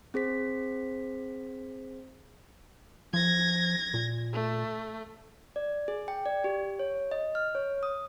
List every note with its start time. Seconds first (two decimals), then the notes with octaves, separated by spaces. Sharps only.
0.14 C4 G#4 C5 B6
3.13 F3 G#6 A#6
3.94 A#2
4.33 A3
5.56 D5
5.88 G#4
6.08 G5
6.26 D5
6.44 G4
6.79 C#5
7.11 D#5
7.35 F6
7.55 C#5
7.83 D#6